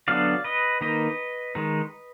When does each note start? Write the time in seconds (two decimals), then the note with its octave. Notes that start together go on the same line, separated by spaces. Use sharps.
0.08 D3 F#3 B3 D4 D5 F5
0.44 B4 D#5
0.81 D#3 A#3 D#4 B4 D#5
1.55 D#3 G#3 D#4